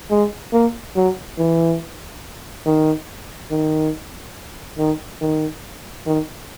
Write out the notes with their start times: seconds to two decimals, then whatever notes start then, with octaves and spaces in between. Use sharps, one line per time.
0.11 G#3
0.53 A#3
0.96 F#3
1.39 E3
2.66 D#3
3.51 D#3
4.79 D#3
5.21 D#3
6.06 D#3